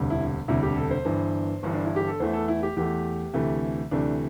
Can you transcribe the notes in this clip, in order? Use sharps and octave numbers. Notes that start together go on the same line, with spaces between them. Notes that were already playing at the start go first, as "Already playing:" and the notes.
Already playing: E1 D2 C3 G3
E4
E1 D2 C3 G3 E4
G4
A4
C5
G1 G2 E3
G1 G2 E3
D4
E4
G4
A4
E2 E3 A3 C5
A4
E4
G4
E2 E3 A3 G4
D2 C3 E3 A3
D2 C3 E3 A3 D4